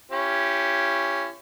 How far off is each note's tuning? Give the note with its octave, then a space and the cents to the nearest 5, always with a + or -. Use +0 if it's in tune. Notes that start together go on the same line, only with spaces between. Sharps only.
C#4 +0 E4 +40 G4 +0